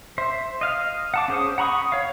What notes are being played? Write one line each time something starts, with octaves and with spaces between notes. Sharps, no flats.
C5 E5
D#5 F5 F6
F#5 A5 D6
C#4 G#4 C5 D#6
F#5 A#5 B5 C#6 D#6
C#5 F5